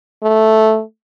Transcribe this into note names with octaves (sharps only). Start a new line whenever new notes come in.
A3